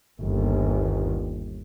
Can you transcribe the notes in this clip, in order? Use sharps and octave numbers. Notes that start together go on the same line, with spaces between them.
G1 D#2